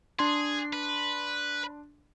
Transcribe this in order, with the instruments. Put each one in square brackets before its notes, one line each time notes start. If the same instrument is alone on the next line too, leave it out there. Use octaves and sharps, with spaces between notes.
[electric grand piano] D4 C6 [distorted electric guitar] G#4
[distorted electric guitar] B4